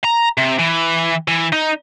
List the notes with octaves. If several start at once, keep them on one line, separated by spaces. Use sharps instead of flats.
A#5
C3
E3
E3
D#4